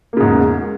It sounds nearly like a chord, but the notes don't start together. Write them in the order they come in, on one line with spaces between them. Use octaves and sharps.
A#3 C#3 G#2 E2